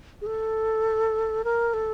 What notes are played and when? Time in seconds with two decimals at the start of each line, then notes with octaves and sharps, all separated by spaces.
0.21 G#4
0.26 A4
1.44 A#4
1.74 A4